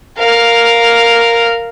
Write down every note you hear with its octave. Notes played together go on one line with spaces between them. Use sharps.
A#4 F5